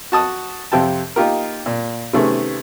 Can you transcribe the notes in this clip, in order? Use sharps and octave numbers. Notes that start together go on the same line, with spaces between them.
F#4 A5 D#6
F2 C3 G5 A5
A#3 D#4 F4 G4 A#4
A#2
C3 D#3 A3 B3 C#4 G#4